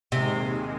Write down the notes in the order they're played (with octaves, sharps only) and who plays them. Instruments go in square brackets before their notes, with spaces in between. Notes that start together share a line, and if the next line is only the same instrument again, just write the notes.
[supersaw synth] D#2 D#3 G#3 [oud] C3